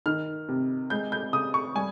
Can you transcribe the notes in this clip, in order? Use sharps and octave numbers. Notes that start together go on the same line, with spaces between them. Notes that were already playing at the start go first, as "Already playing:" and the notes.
D#3 F6
C3
G#3 G6
G6
C#3 D#6
C#6
G3 G#5